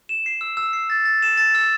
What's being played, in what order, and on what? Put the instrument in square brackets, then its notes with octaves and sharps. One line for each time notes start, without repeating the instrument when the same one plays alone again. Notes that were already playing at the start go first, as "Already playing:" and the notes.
[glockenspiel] E7
C7
E6
E6
C7
A6
A6
E7
A6
E6